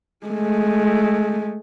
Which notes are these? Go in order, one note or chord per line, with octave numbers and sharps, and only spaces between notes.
G#3 A3